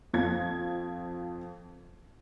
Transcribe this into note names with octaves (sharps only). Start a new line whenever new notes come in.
F2 G#6